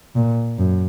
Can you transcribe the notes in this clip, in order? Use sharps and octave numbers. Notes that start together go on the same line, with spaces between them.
A#2
F#2